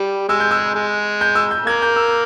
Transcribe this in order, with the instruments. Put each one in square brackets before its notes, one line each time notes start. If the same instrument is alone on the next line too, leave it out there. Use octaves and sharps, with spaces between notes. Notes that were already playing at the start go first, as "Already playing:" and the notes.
Already playing: [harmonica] G3
[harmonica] G#3 [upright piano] E6
[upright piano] G6
E6
[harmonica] G#3
[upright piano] G6
E6
G6
[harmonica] A#3 [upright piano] G#6
[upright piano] G6
E6